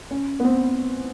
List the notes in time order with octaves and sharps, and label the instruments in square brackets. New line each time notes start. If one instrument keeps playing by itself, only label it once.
[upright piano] C#4
B3
C4